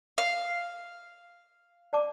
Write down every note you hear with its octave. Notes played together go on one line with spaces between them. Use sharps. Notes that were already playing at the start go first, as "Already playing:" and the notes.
F5
D5 A5 D6